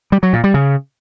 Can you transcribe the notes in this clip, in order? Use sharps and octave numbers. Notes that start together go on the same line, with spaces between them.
G3
F#3
A#2
G3
C#3